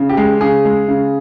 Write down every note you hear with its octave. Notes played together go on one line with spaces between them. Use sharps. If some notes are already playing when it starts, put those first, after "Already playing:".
Already playing: C#3
G4
G#3
C#3 G#4
G#3
C#3